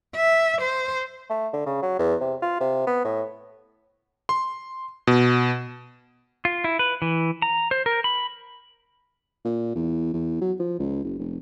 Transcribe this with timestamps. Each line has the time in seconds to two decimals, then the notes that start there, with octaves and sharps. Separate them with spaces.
0.16 E5
0.61 C5
1.30 A3
1.53 D3
1.66 C#3
1.82 F#3
1.99 E2
2.21 C3
2.42 F4
2.60 C3
2.87 B3
3.05 A2
4.29 C6
5.07 B2
6.45 F4
6.64 E4
6.79 B4
7.02 E3
7.42 A#5
7.71 C5
7.86 A#4
8.04 B5
9.45 A#2
9.75 E2
10.13 E2
10.41 F#3
10.59 F3
10.79 C#2
11.04 F#1
11.19 F1